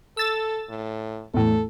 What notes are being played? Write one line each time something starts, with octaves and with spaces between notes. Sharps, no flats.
A4 E6 A6
A2
E2 A2 A4